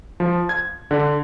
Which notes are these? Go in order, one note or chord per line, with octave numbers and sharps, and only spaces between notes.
F3
G#6
D3